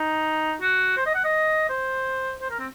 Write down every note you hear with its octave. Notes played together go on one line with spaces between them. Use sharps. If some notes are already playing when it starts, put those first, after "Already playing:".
Already playing: D#4
F#4
C5
D#5
F#5
D#5
C5
C5
A#4
C4